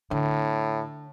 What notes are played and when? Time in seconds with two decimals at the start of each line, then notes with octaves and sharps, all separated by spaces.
0.11 A2 D3